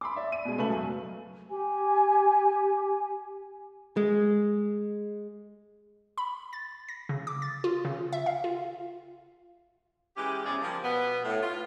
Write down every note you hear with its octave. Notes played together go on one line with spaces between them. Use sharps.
B5 C6 D6
D5 E5
D#7
B2 G#3
C#3 A3 B4 E5 A5 F#7
F#2
G4 G#5
G#3
B5
A6
A#6
C#3
D6
A6
F4
C#3
E5
F5
F4
E3 G#3 C#4 G4
E2 C#3 F3 E4 G#4 D5
F3 G3 A#3
B2 B3
A2
F4